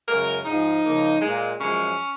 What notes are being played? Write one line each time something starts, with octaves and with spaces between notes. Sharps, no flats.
F#2 C#3 G#3 A#4
G#2 F3 G#3 D#4
C#3 F3 A#3
A#2 G#3
F#2 F3 G#3 C#4